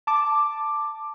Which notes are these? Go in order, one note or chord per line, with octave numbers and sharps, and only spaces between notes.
A5 D6